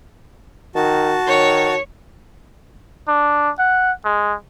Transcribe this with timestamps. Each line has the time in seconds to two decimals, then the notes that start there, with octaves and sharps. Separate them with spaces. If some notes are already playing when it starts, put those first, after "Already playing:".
0.75 D#3 F#4 A5
1.28 D#3 C#5
3.08 D4
3.59 F#5
4.05 G#3